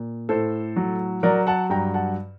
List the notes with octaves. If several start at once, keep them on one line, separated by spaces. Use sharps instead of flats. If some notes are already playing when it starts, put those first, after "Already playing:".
Already playing: A#2
A2 A4 C5
F#3
F#3 A#4 D5
F#5 A5
G2 G5 A#5
F#5 A5